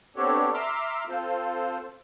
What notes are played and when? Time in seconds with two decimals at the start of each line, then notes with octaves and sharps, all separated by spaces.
0.16 B3 C4 D4 G4 A4 C#5
0.53 E5 A#5 C6 D6 E6 F6
1.08 C4 F4 A4 C5